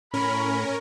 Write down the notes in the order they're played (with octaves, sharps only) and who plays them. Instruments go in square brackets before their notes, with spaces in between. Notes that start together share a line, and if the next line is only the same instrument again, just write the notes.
[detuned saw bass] A2 [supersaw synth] C#4 A#4 [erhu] B5